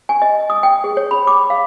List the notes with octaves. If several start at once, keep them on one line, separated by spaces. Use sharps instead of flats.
G#5
D#5
D#6
G5
G#4
C#5
B5
D6
F5